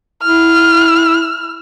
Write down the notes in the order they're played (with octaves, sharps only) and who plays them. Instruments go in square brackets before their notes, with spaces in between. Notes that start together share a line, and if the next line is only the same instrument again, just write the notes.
[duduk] E4 [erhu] F6